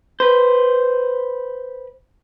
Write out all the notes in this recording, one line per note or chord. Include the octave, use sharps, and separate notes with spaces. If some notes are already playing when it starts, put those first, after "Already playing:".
B4 C5